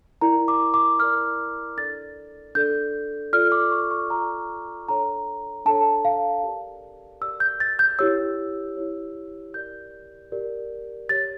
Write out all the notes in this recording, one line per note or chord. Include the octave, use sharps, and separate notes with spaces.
E4 A#4 D5 A#5
D6
D6
E4 A#4 D5 F6
D4 A4 D5 A6
D4 A4 D5 G6
F4 A4 D5 F6
D6
C#6
C#6
F4 A4 D5 A#5
D4 A4 C#5 A#5
D4 A4 C#5 A5
F5
G4 A#4 D5
G4 A#4 D5 E6
G6
A6
G6
E4 G4 C#5 E6
E4 G4 C#5
G4 A#4 D5 G6
G4 A#4 D5
G4 C#5 A6